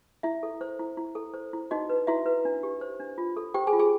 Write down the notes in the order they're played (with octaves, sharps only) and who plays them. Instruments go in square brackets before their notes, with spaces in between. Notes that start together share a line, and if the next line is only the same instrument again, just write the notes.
[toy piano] E4 E5
A4
C5
E4
E4
A4
C5
E4
D#4 F#4 D#5
B4
E4 F#4 E5
B4
D4
G4
C5
D4
F4
A4
G4 C5 G5
G#4 G#5
F4
G#4 G#5